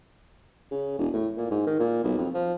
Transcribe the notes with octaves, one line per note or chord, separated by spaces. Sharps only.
C#3
E1
A2
A#2
G#2
D#3
A#2
B1
F2
F3